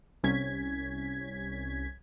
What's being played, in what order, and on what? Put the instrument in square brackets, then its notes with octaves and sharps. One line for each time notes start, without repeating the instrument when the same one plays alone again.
[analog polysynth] C2 C#4 G#6 B6